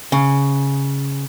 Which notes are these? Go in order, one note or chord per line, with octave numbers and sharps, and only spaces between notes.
C#3